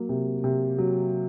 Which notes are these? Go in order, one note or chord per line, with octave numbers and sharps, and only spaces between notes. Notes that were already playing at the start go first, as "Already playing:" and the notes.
Already playing: F#3 A#3
C3
C3
F#3